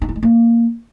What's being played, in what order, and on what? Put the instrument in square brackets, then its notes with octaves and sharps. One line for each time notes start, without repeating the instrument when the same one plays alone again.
[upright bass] D#4
E4
G#3
A#3